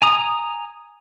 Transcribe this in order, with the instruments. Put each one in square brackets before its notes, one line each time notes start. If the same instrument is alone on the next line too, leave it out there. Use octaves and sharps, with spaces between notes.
[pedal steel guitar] G#5 A#5 D#6